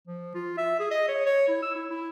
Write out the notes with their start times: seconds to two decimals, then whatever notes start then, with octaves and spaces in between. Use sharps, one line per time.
0.08 F3
0.35 F4
0.58 E5
0.80 G#4
0.91 D#5
1.08 C#5
1.26 C#5
1.48 E4
1.62 E6
1.75 E4
1.90 E4